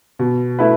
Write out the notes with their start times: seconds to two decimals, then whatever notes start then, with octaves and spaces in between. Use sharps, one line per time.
0.19 B2
0.59 A3 E4 B4